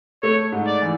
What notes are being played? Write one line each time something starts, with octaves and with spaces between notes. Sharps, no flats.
A3 C#5
G#2
D5
E3